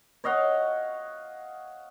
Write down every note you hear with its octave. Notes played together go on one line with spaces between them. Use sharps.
C#5 D#5 F5 F#5